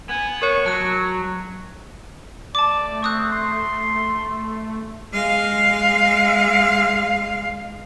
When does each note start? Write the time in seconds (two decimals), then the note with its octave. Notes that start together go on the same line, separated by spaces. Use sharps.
0.09 B3 G#5
0.42 A#4 C#5 C#6
0.66 F#3 A5 F#6
2.55 A3 D5 A5 D6
3.03 C4 C#6 D#6 F#6
3.32 C6
5.13 G#3 F5